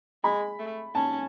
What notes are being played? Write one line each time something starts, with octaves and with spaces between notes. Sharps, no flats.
G#3 B5
A3
C#4 A5